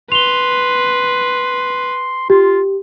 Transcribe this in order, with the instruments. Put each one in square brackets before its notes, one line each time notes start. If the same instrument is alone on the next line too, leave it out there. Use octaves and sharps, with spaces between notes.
[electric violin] B4 [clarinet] C6 [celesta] F7 G7
[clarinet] F4 [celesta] G4